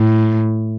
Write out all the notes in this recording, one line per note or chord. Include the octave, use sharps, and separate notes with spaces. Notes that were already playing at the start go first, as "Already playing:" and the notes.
Already playing: A2